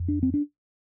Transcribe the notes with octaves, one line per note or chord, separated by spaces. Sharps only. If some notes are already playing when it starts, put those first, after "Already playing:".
Already playing: F2
D4
C4
D4